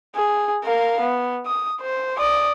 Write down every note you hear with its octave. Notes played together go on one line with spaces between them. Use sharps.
G#4
A#4 F5
B3
D#6
C5
D5 D#6